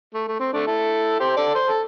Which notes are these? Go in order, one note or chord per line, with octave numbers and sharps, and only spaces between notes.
A3
A3
C4
A3 D4
E4 A4
G4 C5
A4 D5
C5
A4